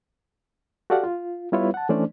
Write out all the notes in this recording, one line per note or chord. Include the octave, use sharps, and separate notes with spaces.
F#4 G4 A4 D5 F5 F#5
F4
G3 B3 E4 F4 B4 C#5
F#5 A5
E3 A3 C#4 D4 C5 D5